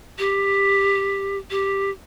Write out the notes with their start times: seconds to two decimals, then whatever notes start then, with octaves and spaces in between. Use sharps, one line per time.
0.18 G4
1.50 G4